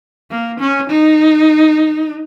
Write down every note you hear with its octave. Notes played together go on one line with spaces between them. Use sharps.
A#3
C#4
D#4